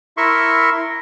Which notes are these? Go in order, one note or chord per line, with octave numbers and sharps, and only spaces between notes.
E4 A#4 E5 C6 C#6